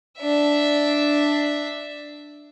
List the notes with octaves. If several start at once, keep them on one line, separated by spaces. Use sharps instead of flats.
D4 E5